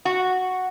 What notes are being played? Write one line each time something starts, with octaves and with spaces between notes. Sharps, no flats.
F#4